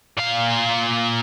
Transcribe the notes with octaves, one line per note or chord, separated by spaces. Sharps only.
A#2 F5